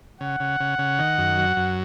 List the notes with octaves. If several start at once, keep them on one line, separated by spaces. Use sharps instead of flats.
C#3 F#5
C#3
C#3
C#3
D#3
F#2
F#3
F#2